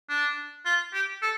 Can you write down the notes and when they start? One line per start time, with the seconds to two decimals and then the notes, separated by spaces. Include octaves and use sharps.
0.09 D4
0.65 F4
0.93 G4
1.22 A4